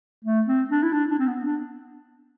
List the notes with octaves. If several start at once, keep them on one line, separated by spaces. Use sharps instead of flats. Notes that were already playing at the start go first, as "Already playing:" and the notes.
A3
C4
D4
E4
D4
D4
C4
B3
D4